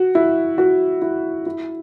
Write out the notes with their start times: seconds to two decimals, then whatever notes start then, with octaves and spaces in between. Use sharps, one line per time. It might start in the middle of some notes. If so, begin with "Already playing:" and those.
Already playing: F#4
0.15 E4
0.58 F#4
1.02 E4
1.46 E4